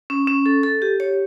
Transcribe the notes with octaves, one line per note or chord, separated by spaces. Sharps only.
C#4
C#4
A4
A4
G4
C#5